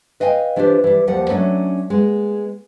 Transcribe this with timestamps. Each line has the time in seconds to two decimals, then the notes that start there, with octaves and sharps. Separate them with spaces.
0.20 B4 D#5 F5 G5 G#5
0.56 E3 D4 F4 G4 C5
0.84 E3 G3
1.07 D#2 F3 G3 F#5
1.29 F#3 A3 C#4 D4
1.90 G#3 B3